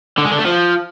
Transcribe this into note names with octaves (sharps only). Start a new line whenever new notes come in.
D3
G#3
D3
A3
F3